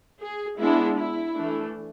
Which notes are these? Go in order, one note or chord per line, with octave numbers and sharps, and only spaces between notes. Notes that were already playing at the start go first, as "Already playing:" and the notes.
G#4
G#3 B3 D4 E4
E4
E3 A3 D4